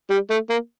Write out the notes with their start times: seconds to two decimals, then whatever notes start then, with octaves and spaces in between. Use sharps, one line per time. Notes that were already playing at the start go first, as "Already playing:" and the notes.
0.10 G3
0.30 A3
0.50 A#3